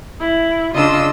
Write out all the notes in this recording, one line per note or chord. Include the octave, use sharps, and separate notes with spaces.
E4
C#3 D4 F4 D#5 E6